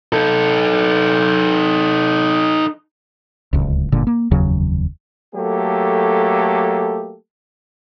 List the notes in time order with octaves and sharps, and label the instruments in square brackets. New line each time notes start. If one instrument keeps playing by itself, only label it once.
[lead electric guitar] D#4 A4
[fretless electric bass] D1 C#2
G1 A#2 D3
A#3
F1 D#2 C#3 F#3
[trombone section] F#3 A3 A#3 G4 A4